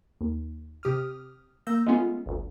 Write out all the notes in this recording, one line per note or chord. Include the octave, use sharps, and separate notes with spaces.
D#2
C3 G4 D#6 F6
A#3 E6 G6 A#6
G#3 A3 B3 C#4 F4
G1 D2